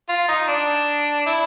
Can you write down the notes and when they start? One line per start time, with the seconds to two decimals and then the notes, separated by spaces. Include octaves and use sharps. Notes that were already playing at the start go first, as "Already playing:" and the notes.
0.09 F4
0.28 D#4
0.48 D4
1.26 E4